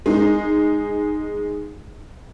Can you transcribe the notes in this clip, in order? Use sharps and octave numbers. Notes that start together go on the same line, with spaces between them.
G#3 D#4